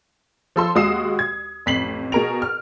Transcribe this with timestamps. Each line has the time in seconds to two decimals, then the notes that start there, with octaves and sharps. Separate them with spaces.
0.56 F3 A4 C6 E6
0.75 D#2 G#3 F#4 D#6 C7 E7
1.19 G#6
1.66 A1 F2 B6 C7 F#7
2.12 B2 G#4 A#4 D7 F7
2.42 F6